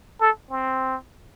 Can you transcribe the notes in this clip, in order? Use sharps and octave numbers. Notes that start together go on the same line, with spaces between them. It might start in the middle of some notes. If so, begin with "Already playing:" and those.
A4
C4